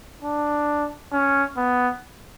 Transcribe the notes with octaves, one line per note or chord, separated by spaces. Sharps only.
D4
C#4
B3